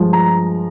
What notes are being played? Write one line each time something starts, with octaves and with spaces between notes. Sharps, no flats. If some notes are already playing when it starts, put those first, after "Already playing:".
Already playing: G2 F3 G#3
A#5